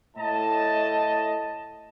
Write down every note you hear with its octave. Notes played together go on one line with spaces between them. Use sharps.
A2 D#5 A5